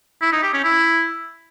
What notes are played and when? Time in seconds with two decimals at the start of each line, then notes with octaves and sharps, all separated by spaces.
0.22 E4
0.32 D#4
0.43 G4
0.53 C#4
0.64 E4